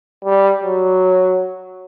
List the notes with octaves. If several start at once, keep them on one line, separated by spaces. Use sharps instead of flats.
G3
F#3